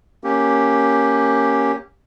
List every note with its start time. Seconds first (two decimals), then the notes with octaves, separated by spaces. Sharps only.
0.24 A#3 C#4 G4